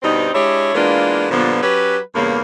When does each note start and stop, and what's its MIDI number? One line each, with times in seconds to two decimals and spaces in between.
0.02 0.30 43
0.02 0.30 47
0.02 0.30 55
0.02 0.30 60
0.02 0.30 63
0.33 0.73 56
0.33 0.73 62
0.33 0.73 64
0.33 0.73 67
0.33 0.73 73
0.74 1.26 52
0.74 1.26 56
0.74 1.26 58
0.74 1.26 59
0.74 1.26 62
0.74 1.26 65
1.31 1.59 43
1.31 1.59 46
1.31 1.59 50
1.31 1.59 53
1.31 1.59 59
1.62 1.98 54
1.62 1.98 61
1.62 1.98 67
1.62 1.98 71
2.15 2.40 40
2.15 2.40 43
2.15 2.40 49
2.15 2.40 58